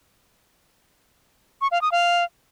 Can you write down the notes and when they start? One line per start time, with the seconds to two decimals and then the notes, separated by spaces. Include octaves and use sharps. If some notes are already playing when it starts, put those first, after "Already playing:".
1.61 C#6
1.71 F5
1.82 D#6
1.92 F5